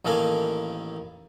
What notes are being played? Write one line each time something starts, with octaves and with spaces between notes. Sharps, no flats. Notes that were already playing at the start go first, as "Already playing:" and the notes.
A1 D#3 A#3 A4 F5 G#5